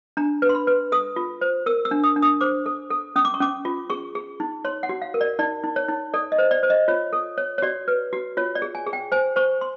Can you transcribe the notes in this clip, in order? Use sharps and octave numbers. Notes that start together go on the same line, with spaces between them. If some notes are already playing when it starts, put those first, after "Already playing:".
D4 A#5
B4
C6
B5
B4
A4 D#6
F4
C5
A#4 E6
E6
D4
D#6
D4
D#6
C5 D6
A4
A4
C#4 D#6
D6
C#6
C#4 D6
F4
G#4 C#6
G#4
D#4
C#5 C6
F#5
F#4
F5
A#4
D5
D#4 D5
D#4
C#5
D#4
A4 D5
D#5
C5
D5
C5
D#5
F4 C#5
A4
C#5
C#5
F#4 D5
B4
F#4
F4 C#5
D5
G#4
G#5
G#4
G5
C5 G#5
C5 C#6
C6